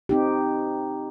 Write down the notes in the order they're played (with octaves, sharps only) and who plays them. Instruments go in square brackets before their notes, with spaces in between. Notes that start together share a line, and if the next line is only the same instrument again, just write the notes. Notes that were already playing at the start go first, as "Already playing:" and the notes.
[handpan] C4 D#4 G4